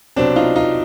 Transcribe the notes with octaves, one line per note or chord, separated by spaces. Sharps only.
C2 B2 F#3 C4 D4
D#4 F4
D#4 F4